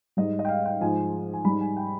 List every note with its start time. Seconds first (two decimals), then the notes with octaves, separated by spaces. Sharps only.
0.17 G#2 G3 D#5
0.39 D#5
0.45 G5
0.49 F5
0.65 G5
0.81 G#2 F3 G#3 G#5
1.33 G#5
1.45 G#2 G3 B5
1.61 G#5
1.77 G5